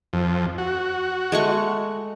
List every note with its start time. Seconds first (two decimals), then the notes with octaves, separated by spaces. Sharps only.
0.13 F2
0.58 F#4
1.32 G#3 A3 C#6